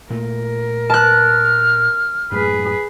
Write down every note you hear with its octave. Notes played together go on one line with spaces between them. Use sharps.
A#2 A3 A#4
A5 F6 F#6
F#2 A2 G#4 B4